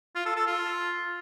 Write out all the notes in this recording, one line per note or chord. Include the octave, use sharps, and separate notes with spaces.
F4
A4
A4
F4